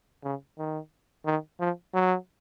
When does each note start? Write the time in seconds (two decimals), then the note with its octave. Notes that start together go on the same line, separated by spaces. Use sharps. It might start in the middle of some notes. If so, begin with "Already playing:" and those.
0.24 C#3
0.58 D#3
1.26 D#3
1.60 F3
1.94 F#3